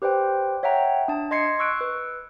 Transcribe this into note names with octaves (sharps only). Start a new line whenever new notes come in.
G4 B4 C5 D5 G5
C#5 E5 F#5 G5 A#5
D4 A5
D#5 C6 G#6 C7 C#7
C#6 E6 F#6 D7
B4 E6